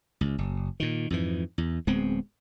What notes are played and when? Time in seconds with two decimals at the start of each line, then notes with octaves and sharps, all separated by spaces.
0.21 C#2
0.38 F#1
0.80 A#2 D#3
1.10 F2 G#2 E3
1.58 E2
1.87 D1 G#3 B3 C4